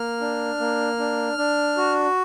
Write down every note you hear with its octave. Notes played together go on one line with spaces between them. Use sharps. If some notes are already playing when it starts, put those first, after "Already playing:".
Already playing: A#3 F6
D4
A#3
D4
D4
F#4